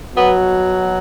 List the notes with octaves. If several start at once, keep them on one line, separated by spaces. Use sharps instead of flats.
B2 F#3 B3